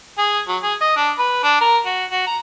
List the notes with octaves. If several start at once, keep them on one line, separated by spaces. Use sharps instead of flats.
G#4
F#3
G#4
D#5
D4
B4
D4
A#4
F#4
F#4
A#5